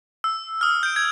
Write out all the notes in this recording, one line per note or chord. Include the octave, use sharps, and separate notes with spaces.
E6
D#6 F6
G6 D7
G#6